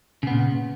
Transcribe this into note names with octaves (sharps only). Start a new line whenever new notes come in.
A#2 C#3 B3